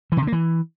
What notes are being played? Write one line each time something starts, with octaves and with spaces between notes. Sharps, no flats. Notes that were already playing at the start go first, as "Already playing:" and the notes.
E3
C3
D3
A#3
E3